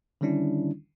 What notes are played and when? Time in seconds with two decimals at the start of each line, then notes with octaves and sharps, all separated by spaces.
0.21 D3 D#3 G3 C#4 D4 E4